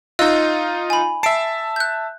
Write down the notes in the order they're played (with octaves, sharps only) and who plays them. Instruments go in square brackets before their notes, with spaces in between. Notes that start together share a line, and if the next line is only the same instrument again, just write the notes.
[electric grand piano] D#4 F4 [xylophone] D#5 E6 F#6
[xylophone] G#5 B5
[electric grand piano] E5 A5 [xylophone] C7 D7
[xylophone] F#6 G6